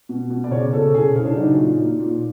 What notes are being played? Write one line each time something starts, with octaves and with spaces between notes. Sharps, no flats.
B2
B2
D5
C#3 C#5
C#3 A4
C#3 G#4
C#3 C#4
D4
F#3 D#4
A#2
A#2
A#2